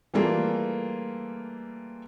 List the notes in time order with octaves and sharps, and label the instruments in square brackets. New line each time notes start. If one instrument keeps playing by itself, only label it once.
[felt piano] E3 G3 A3 A#3 F4 G#4